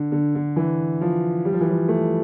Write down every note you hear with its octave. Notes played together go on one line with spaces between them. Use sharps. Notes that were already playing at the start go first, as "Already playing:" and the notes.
Already playing: D3
D3
D3
E3
F3
G3
F3
E3
F3
A3